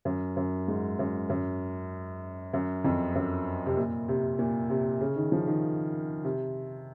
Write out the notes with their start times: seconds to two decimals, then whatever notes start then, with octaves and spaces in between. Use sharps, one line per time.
0.05 F#2
0.37 F#2
0.68 G#2
0.99 F#2
1.30 F#2
2.53 F#2
2.84 F2
3.15 F#2
3.66 C3
3.77 A#2
4.08 C3
4.39 A#2
4.70 C3
5.01 C#3
5.16 D#3
5.32 F3
5.47 D#3
6.24 C3